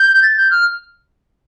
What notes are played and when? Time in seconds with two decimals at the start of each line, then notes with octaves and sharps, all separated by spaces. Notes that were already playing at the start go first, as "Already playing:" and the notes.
Already playing: G6
0.23 A6
0.37 G6
0.51 F6